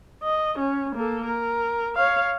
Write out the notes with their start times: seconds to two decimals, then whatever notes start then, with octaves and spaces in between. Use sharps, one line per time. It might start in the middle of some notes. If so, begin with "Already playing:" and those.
0.23 D#5
0.59 C#4
0.95 A#3 A4
1.25 A#4
1.96 C#5 F5